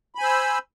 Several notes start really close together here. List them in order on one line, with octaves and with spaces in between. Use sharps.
B5 G#5 C5 E6